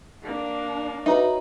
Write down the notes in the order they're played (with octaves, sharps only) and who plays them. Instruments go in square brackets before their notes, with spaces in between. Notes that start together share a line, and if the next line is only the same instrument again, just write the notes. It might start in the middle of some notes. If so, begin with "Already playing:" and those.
[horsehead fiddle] A#3 D4
[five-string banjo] D#4 [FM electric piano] F#4 B4 C#5 [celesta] E5 A#5